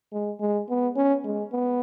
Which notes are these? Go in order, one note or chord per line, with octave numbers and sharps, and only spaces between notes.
G#3
G#3
B3
C#4
G#3
B3